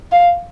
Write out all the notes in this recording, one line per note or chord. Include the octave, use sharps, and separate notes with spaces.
F5